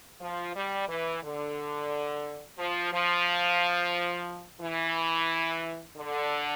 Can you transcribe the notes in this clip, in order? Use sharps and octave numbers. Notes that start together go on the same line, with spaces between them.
F3
G3
E3
D3
F3
F3
E3
D3